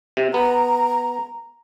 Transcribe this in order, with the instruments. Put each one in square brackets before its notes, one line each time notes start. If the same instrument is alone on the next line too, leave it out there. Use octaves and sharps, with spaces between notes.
[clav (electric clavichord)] C3
[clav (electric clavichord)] B3 [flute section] A#5